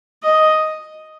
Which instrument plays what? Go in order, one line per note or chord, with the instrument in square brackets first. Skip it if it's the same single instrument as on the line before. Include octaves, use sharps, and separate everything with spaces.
[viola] D#5